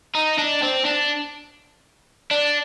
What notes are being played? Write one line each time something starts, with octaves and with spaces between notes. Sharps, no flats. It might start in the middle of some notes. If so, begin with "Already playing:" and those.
D#4
D4
C4
D4
D4